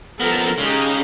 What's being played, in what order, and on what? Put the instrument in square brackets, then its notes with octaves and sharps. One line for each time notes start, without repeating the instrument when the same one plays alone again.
[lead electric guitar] F3 B3 [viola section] A4 A#4
[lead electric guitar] C#3 [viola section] G#3 D#4 G4